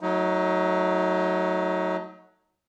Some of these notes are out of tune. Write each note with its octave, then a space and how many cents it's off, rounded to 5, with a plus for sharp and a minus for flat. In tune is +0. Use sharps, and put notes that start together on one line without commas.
F#3 +0 A3 +0 D#4 +30